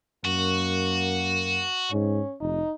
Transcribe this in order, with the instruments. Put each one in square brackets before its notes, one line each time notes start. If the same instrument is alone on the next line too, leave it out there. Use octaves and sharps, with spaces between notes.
[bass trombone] F#2 [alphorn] A#3 [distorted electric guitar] F#4
[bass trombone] G#2 [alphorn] C#4
[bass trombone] F1 [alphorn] D#4